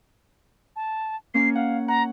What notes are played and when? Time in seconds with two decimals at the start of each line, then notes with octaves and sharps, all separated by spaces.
0.76 A5
1.34 A#3 C#4 C#5 C7
1.55 F5 F#5
1.88 F#5 A#5